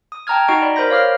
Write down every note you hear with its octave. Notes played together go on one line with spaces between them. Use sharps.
D#6
G5 A5 A#5 D#6 F6 G#6
D#4 F#4 D#5 A#5 C#6 D7
D5 B5
A#4 C5 B5 G6 A#6
C#5 F5 D6 F6 A#6